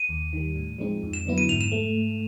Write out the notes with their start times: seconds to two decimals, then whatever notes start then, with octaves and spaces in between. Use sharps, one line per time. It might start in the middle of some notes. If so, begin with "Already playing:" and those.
Already playing: D#7
0.09 D#2
0.33 D#3 G3
0.56 A2
0.78 F3 G#3 C4 D#4
1.03 F2
1.13 E7
1.26 D3 F#3 B3 E4
1.38 D#7
1.49 G#2 F7
1.61 E7
1.72 A3